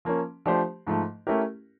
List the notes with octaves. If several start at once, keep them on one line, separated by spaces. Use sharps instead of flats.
F3 A#3 C#4
F3 A3 D4 G4 C5
G#2 F3 A3
A3 C#4 E4 G4 A#4